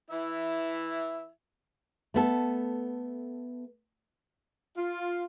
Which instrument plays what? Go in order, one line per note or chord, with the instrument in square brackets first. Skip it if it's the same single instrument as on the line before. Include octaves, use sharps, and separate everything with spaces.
[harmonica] E3 E4 E5
[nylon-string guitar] A3 B3 A4
[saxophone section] F4